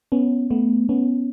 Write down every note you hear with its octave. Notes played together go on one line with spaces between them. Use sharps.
B3 C#4
A3 B3
B3 C#4